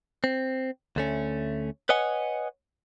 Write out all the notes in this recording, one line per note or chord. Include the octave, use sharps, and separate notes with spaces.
C4
D2 A3 C#4
B4 C#5 D#5 F#5 G#5